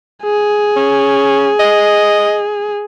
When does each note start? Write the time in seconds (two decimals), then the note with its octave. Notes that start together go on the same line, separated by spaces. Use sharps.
0.24 G#4
0.76 C#4
1.60 D#5